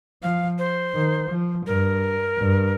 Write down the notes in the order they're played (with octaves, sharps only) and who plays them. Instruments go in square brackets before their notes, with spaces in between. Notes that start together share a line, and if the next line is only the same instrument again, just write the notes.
[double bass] F3 [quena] F5
[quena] C5
[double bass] D#3
F3
[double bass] G2 [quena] A#4
[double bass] G2